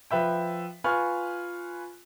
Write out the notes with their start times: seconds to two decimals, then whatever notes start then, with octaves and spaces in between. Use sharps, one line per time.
0.11 F3 B4 E5 G5
0.84 F4 B4 G#5 C#6 F6